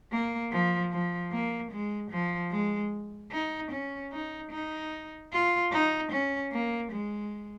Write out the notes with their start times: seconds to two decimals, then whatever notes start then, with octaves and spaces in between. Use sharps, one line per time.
0.12 A#3
0.51 F3
0.91 F3
1.32 A#3
1.71 G#3
2.11 F3
2.51 G#3
3.32 D#4
3.71 C#4
4.12 D#4
4.51 D#4
5.32 F4
5.72 D#4
6.11 C#4
6.52 A#3
6.92 G#3